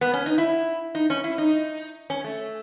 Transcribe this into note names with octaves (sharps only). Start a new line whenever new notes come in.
B3
C#4
D#4
E4
D#4
C#4
E4
D#4
C#4
A3